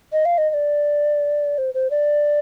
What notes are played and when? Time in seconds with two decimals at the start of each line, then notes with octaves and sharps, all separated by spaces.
0.13 D#5
0.25 F5
0.38 D#5
0.50 D#5
0.54 D5
1.58 C5
1.74 C5
1.90 D5